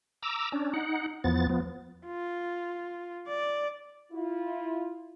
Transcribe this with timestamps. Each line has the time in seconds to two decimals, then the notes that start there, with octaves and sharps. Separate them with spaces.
0.22 A#5 D6 E6
0.52 C#4 D4
0.74 D#4 F#5
1.24 E2 F3 B3 A6
1.49 F3 B3
2.07 F4
3.28 D5
4.12 E4 F4